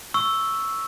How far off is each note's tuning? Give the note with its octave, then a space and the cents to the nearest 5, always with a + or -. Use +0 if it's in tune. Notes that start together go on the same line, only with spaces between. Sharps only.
C#6 +0 E6 +0